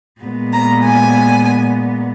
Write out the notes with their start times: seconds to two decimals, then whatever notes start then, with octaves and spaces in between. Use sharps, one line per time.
0.21 A#2 G#3 B3
0.53 A#5
0.83 G#5